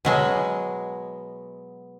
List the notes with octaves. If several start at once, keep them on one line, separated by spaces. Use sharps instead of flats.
B2 F#3 G#3